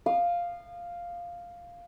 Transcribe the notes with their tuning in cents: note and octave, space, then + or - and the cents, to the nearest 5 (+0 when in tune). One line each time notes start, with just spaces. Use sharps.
F5 +0 D#6 -35